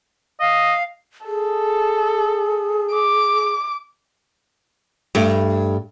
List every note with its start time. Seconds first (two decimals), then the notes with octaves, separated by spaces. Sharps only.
0.40 D#5 F5
1.26 G#4 A4
2.93 D6
5.15 G2 A3